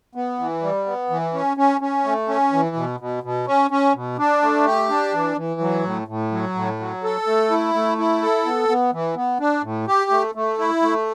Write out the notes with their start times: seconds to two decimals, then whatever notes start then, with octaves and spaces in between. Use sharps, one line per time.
0.15 B3
0.39 E3
0.62 G3
0.86 B3
1.10 E3
1.34 C#4
1.57 C#4
1.81 C#4
2.05 A3
2.29 C#4
2.53 E3
2.76 B2
3.00 B2
3.23 B2
3.47 C#4
3.71 C#4
3.95 B2
4.18 D4
4.42 A3
4.66 G4
4.89 D4
5.14 E3
5.37 E3
5.61 F#3
5.84 A2
6.08 A2
6.32 F#3
6.55 A2
6.80 F#3
7.03 A4
7.27 A3
7.51 E4
7.74 A3
7.98 E4
8.22 A4
8.46 B3
8.69 B3
8.93 E3
9.16 B3
9.40 D4
9.63 A2
9.88 G4
10.11 A3
10.35 A3
10.59 E4
10.82 A3